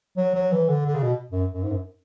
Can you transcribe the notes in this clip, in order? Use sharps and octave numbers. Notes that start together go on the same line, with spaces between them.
F#3
F#3
E3
D3
D3
C#3
B2
F#2
F#2
G#2
F#2